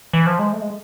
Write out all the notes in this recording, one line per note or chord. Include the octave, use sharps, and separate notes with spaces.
E3
F3
G#3
A3
G#3